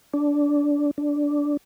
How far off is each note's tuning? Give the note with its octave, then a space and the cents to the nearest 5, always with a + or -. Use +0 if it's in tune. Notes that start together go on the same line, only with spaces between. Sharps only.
D4 -15
D4 -10